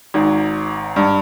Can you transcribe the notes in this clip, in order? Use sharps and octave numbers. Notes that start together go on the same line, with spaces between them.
G#1 G#2
G2